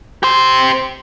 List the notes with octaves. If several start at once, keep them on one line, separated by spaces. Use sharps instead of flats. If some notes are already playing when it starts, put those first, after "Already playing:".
G4 C5